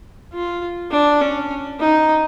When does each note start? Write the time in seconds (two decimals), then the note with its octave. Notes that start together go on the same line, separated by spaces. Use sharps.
0.33 F4
0.91 D4
1.21 C#4
1.80 D#4